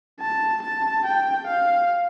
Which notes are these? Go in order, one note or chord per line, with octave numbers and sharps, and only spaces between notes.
A5
A5
G5
F5